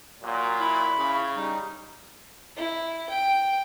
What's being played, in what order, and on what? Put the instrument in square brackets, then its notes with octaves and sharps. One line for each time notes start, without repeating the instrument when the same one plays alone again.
[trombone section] A#2 F#3
[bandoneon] E4 B5
[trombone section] C#3
[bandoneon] G3 D#4
[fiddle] E4
G5